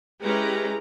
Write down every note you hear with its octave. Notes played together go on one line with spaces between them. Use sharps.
G#3 C#4 E4 G4 B4 A#5